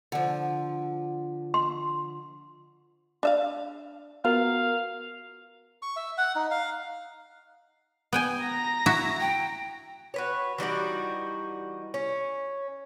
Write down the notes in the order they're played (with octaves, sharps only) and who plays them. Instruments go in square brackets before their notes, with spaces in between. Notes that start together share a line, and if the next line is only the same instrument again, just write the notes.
[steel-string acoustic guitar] D3 F3
[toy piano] C6
[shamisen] D4 E5 F5
[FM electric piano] B3 F#4 A#4 [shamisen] F4 [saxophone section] F5
[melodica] C#6
E5
F#5
D#4
F5
[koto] B3 G5 G#5
[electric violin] A#5 A#6
[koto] E4 F#4 E5
[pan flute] G5
[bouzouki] F#4 B4 C#5
E3 G3 D#4 F#4
C#4